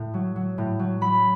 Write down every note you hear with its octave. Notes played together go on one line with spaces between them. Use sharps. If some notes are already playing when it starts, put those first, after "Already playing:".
Already playing: A2
F#3
F#3
A2
F#3
F#3 B5